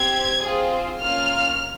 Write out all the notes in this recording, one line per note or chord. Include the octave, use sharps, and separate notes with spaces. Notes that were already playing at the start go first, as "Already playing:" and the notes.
Already playing: C4 G4 G#6
C4 F4 G#4
A#3 C#4 F4 F6